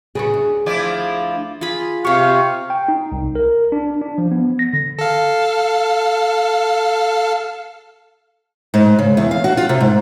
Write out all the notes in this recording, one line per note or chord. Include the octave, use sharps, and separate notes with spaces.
C#3 B3 F#4 G#4
D2
F3 E4 D5
F4 G#4 B5
C3 G4 F5 C#6
G5
D#4
C2
A#4
D4
D4
F3
B3
A#6
D3
A4 F5
G#2
C#3
E2
F5
F#4
F4
C3
G#2